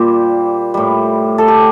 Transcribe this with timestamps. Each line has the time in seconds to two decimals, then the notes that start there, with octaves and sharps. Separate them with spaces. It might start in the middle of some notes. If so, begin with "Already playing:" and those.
Already playing: A#2 G3 C5
0.74 A2 G3
1.38 A4
1.48 G4